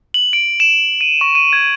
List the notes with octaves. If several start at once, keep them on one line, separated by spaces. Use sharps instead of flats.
F#7
D7
E7
D#7
C#6
D#7
G#6